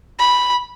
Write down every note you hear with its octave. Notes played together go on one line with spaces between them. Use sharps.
B5